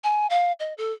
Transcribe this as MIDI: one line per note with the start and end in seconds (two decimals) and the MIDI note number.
0.04 0.27 80
0.30 0.52 77
0.60 0.73 75
0.78 0.92 69